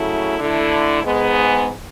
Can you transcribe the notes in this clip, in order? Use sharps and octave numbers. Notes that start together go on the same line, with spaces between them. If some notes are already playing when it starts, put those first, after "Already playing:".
Already playing: C#3 F#3 A3 E4
D3 A3 E4
G#2 G#3 B3